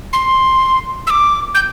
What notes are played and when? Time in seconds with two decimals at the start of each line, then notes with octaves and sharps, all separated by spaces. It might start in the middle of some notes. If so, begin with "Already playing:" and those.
0.13 C6
1.07 E6
1.10 D6
1.55 G6